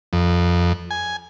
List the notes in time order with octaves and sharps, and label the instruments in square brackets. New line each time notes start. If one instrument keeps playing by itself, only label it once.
[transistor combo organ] F2
G#5